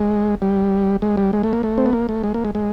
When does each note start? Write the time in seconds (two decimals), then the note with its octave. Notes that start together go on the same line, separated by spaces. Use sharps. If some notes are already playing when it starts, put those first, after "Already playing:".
Already playing: G#3
0.42 G3
1.02 G#3
1.17 G3
1.33 G#3
1.43 A3
1.53 A#3
1.63 A3
1.78 C4
1.86 B3
1.93 A#3
2.09 A3
2.24 G#3
2.34 A#3
2.45 G#3
2.55 G#3